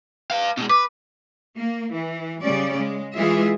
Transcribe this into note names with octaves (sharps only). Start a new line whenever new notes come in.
B4 F5
B2 G#3
B4 D6
A#3
E3
C#3 G3 C#4 D5
G#3
E3 G#3 F4 G#4 E5